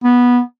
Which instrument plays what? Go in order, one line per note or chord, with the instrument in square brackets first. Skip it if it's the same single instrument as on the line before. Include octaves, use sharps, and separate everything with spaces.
[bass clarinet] B3